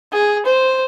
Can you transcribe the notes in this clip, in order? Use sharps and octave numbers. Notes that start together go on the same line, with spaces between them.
G#4
C5